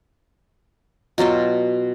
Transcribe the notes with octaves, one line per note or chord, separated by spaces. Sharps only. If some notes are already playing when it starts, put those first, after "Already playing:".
B2 F#3 F4 G5